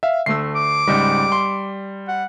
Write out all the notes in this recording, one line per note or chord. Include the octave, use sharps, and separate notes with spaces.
E5 F5
D2 A3 E6 C7
D6
C#2 G#2 G3
C6
F#5